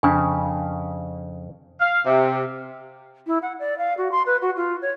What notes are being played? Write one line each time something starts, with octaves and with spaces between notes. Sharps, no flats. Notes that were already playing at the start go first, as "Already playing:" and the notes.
F2 C#3 D4 G#5
F5
C3
E4
F#5
D5
F5
F#4
C6
B4
F#4
F4
C#5